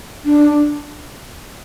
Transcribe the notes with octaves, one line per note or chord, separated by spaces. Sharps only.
D4